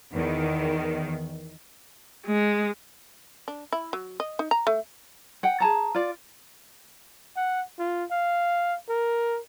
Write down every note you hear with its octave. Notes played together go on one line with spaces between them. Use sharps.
E2 D#3
G#3
D4
E4
F#3
D#5
D#4
A#5
A3
F#5 G5
G#4 A5 A#5
F4 D5
F#5
F4
F5
A#4